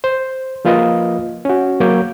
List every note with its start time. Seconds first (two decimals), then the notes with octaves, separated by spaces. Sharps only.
0.04 C5
0.65 F3 A#3 F4 B4 D#5
1.45 C#4 F#4
1.80 F#3 A#3 C#5 D6 G6